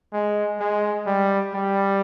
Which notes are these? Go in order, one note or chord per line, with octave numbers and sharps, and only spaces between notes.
G#3
G#3
G3
G3